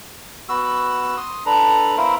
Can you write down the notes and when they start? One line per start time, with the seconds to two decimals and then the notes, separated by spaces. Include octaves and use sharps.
0.49 B3 F#4 E6
1.17 C6 D#6
1.46 D4 A4 B4 A#5
1.97 B3 E4 A#4 C5 E5 F5